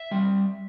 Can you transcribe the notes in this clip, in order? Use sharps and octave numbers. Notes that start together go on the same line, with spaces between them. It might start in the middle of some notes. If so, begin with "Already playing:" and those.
Already playing: E5
G3